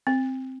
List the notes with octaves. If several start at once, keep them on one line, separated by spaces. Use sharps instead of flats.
C4